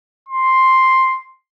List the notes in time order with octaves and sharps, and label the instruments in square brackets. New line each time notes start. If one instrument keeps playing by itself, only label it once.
[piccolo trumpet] C6